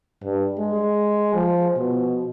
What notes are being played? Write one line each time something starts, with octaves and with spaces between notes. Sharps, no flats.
G2
G#3
F3
B2